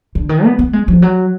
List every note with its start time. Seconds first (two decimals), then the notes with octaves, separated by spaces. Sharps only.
0.15 D3
0.29 D#3
0.44 B3
0.59 B3
0.73 G#3
0.88 F3
1.02 F#3